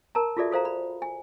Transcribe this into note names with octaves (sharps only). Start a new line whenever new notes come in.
A#4 A5 A#5
F4 F#4 G#4 A4 D5 E5
F#4 A4 C5 F5 A#5
B5
G#5